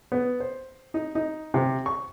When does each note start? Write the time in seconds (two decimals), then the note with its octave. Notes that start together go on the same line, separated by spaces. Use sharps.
0.12 B3
0.40 C5
0.94 D#4
1.15 D#4
1.54 C3
1.86 C#6